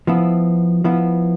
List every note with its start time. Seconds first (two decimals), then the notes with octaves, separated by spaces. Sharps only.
0.07 F3 B3 E4
0.84 F3 B3 E4